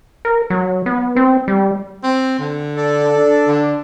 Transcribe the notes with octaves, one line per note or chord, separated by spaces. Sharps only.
A#4
F#3
B3
C4
G3
C4
D3
A4 D5
D4
D3